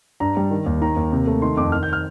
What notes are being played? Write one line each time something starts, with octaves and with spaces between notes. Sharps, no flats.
G2 A#5
G3
D#3
D#2
D#3 A#5
D#2
C3
A3
D#3 C6
F2 D6
D#3 F6
G6
F6